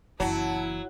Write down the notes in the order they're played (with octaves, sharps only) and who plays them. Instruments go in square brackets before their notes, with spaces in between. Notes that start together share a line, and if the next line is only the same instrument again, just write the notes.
[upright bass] F#1 E3 [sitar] F#3 [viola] E4 [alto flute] A5